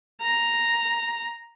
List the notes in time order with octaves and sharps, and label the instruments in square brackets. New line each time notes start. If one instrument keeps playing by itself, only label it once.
[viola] A#5